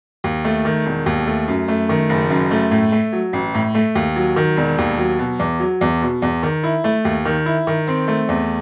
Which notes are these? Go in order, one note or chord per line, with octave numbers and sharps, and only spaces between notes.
D#2
A3
D#3
E1
D#2
A3
F#2
A3
D#3
F#1
F#2
A3
A2
A3
F#3
A1
A2
A3
D#2
F#3
D#3
E1
D#2
F#3
B2
E2
F#3
E2
B2
E2
D#3
E4
A3
D#2
D#3
E4
D#3
C4
A3
E2